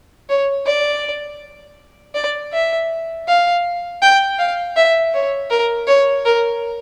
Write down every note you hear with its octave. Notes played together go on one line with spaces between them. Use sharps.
C#5
D5
D5
E5
F5
G5
F5
E5
C#5
A#4
C#5
A#4